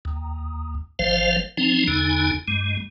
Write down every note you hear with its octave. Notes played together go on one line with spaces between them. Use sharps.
D#2
G#1 F3 C5 F5
F3 C4 C#4 D#4
E2 D3 D#4 G#5
G2 G#3